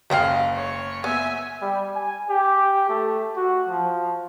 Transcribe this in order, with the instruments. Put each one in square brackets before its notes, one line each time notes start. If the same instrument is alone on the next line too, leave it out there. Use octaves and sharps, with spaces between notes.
[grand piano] F#1 F5 [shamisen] G#3 G#4 G5
[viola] C#5
[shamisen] B3 [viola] E5 G#5
[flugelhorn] G3
G#5
G4
A3
F#4
F3